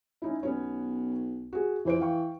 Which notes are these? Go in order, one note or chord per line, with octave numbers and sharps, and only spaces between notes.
C#4 D#4 E4
B1 B3 C#4 C#5
F#4 G#4
F2 E3 C5 D7
F5 G5 C#6